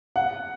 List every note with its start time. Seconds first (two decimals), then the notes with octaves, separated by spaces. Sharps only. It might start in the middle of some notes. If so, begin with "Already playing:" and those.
0.16 F#5